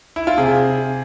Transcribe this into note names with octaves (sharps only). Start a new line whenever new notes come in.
E4
F4
C3 G#4